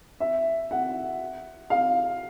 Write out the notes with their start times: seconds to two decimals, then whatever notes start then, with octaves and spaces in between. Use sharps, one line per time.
0.20 E5
0.71 F#5
1.70 F5